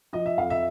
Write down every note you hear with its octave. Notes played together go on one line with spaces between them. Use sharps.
F3 D#5
E5
F2 F5
E5